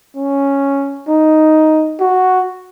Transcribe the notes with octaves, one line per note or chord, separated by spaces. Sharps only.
C#4
D#4
F#4